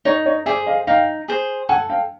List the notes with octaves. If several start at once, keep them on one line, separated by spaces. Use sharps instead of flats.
D#4 C#5 D#5
C#5 D#5
G#4 C5 D5 E5
D#5 F5
D#4 F5 G5
G#4 C5
A4 F#5 G#5
F5 G5